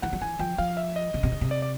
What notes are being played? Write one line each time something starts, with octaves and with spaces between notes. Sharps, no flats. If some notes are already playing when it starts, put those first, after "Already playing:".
E3 F#5
F3
E3 G#5
F3 G5
F3 F5
E5
D#5
C#3
C3
C#3
C3
D5
D5